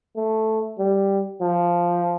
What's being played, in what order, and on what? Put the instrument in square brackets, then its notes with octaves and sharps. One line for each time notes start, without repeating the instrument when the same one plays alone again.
[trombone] A3
G3
F3